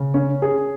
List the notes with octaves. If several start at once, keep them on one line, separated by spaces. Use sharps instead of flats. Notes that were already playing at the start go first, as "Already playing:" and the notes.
Already playing: C#3
C#4
G#4